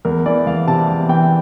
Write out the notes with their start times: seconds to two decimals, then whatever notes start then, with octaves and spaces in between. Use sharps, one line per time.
0.05 E2 A#4
0.26 E3 D5
0.47 E2 F5
0.67 C3 A5
0.88 E2
1.09 E3 G5